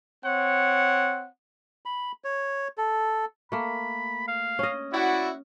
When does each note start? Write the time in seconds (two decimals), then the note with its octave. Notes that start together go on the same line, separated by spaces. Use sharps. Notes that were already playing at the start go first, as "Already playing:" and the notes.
0.24 C4 C#5 F#5
1.86 B5
2.24 C#5
2.78 A4
3.52 A3 A#3 B5
4.28 F5
4.59 C#4 D#5
4.92 E4 F#4 D5